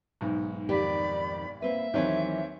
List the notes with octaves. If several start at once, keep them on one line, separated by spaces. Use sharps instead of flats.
B1 G#2
F2 D#3 G4 D5 B5
A#3 C4 B4 E5
D#2 E3 F#3 C4 C#5